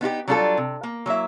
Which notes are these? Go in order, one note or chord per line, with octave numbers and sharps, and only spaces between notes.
B3 D#4 F4 G4
F#3 G3 D4 F4 G#4 A4
C3
A#3
F#3 A#3 E4 E5